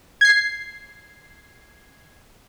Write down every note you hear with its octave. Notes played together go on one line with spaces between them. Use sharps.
G#6 C7